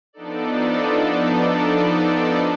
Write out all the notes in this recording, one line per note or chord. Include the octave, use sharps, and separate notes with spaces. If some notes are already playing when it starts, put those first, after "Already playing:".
F3 B3 D4 D#4 A4 D5